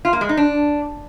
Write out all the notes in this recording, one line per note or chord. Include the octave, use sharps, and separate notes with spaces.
F4
A#3
G#3
D#4
D4